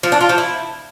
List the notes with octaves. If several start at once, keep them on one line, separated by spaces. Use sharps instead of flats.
F3
D4
F4
F3
E4